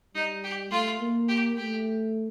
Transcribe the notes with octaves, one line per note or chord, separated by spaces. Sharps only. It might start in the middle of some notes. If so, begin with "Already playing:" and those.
G3 D#4
G4
A3 F4
A#3
G4
A3 G4